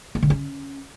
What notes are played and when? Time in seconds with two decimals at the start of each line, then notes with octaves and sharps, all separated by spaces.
0.15 A#3
0.23 D3
0.30 C#4